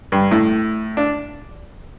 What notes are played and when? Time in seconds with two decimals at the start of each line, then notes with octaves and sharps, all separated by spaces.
0.12 G2
0.31 A2
0.97 D4